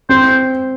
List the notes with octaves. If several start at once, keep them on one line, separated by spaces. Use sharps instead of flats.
C4 C5